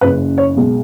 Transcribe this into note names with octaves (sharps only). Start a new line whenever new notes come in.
F#1 F#2 C#3 B4
C#5
B1 B2 G#3